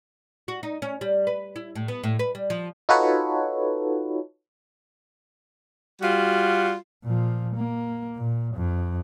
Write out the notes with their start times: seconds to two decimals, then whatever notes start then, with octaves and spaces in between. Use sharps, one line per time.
0.48 F#4
0.63 D#4
0.82 C#4
1.01 G3
1.27 B4
1.56 E4
1.75 A2
1.88 B3
2.03 A2
2.19 B4
2.35 G3
2.50 F3
2.89 D#4 F4 F#4 A4 B4 C#5
6.01 G3 F4 F#4
7.04 A#2 F3
7.56 A#3
8.16 A#2
8.55 F2